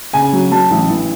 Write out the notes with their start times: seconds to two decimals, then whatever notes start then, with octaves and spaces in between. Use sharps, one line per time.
0.13 C#3 G#5
0.33 F#3
0.52 F#3 A5
0.71 A1
0.90 E3